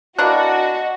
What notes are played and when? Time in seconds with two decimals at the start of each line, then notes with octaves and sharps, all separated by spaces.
0.18 E3 A#3 D4 F#4 D#5 F#6